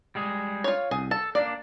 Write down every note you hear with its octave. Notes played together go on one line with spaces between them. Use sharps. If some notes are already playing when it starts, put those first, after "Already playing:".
G3 G#3 G#4
F4 C#5
C2 G#4
A4 A5
A#3 D4 D5